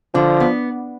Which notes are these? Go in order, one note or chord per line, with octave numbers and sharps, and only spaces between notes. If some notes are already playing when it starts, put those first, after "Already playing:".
D3 F3
B3